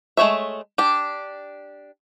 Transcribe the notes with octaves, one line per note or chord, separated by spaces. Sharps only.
G#3 A3 C#5 E5
D4 G4